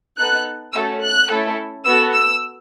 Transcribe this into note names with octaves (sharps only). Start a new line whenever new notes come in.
B3 D#4 A4 F#6
A3 C#4 F#4 A4 E6
F#6
A3 C#4 E4 A4
B3 F#4 A4 E6
E6